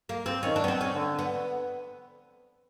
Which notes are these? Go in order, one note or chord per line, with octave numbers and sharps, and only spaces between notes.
A#3
C4
D#3 C#4
D4
B3
C4
C#4
D3
B3